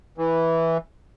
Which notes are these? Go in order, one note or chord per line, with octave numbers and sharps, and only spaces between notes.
E3